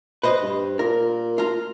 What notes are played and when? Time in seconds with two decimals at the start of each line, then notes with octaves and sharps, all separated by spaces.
0.23 B4 C5 D#5
0.42 G2
0.79 A#2 A#4
1.38 F4 A#5